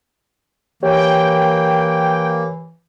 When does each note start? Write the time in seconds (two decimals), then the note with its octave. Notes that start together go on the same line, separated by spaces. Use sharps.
0.83 E3 A#3 G4 C#5 G5